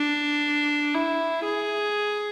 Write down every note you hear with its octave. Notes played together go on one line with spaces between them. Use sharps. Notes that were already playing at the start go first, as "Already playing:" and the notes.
Already playing: D4
E4
G#4